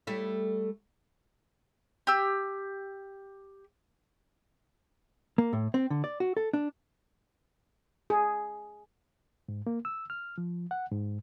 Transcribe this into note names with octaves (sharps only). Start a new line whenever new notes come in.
G3 A3 E4
G4 E6
A#3
A2
C4
D3
D5
F#4
A4
D4
G#4
G#2
A#3
E6
F6
F3
F#5
G#2